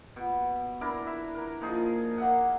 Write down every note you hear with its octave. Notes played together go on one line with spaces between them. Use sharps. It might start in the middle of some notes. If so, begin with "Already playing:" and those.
B2
D4 E4 A#4
E5
A#4
A#2 F3 D#4 G#4
A#3 E5 F#5